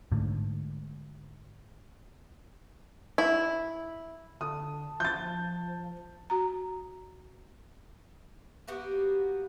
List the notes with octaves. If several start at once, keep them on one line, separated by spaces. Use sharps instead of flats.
G#2 D3 A3
E4
D3 A5 D#6
F3 G6 A6
F#4 A#5
A#3 B3 F#4 G4